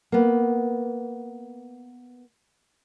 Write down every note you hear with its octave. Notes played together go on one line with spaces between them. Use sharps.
A#3 B3